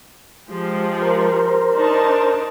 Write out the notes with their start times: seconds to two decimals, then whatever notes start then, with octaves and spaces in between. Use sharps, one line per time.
0.48 F3 G#3 G4
1.02 A#4 C5
1.74 D4 D#4 A5